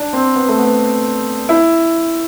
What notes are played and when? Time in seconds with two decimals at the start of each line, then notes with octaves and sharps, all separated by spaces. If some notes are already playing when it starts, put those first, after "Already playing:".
Already playing: D4
0.13 C4
0.35 B3
0.49 A3
0.58 B3
1.49 E4